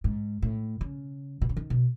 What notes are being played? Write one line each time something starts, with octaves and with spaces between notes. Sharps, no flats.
G#2
A2
C#3
B2
C#3
D#3
B2